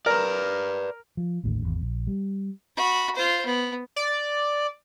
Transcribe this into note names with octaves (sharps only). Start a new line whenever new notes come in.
A#4 B4 D5
F3
A1 D#2 A2 D3
G#1 E2
A#1
G3
F#4 B5
F4 C5
B3
D5